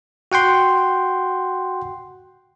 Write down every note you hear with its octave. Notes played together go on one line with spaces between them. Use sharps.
F#4 F#5 G5 C6